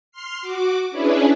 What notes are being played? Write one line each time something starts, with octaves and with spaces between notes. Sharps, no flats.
C6 F6 C7
F#4 D6
C#4 D4 E4 G#4 B4